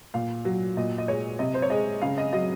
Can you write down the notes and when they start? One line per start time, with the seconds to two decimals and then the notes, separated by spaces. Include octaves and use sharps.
0.14 A#2 F5
0.45 F#3
0.77 A#2 D#5
0.98 D#5
1.08 G#3 C#5
1.39 C3 D#5
1.54 C5
1.62 C#5
1.70 G#3 D#5
2.02 C#3 F5
2.18 D#5
2.33 F#3 D#5